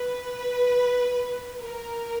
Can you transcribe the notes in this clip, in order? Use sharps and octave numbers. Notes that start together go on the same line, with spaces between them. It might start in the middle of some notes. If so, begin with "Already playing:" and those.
Already playing: B4
A#4